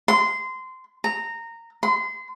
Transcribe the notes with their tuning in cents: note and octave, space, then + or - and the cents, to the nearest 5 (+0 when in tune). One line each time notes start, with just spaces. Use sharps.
C6 -20
A#5 -15
C6 -30